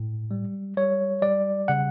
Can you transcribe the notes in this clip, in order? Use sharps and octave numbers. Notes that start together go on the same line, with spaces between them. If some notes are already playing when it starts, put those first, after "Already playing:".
Already playing: A2
G3
G3 C#5
G3 D5
C#3 F#5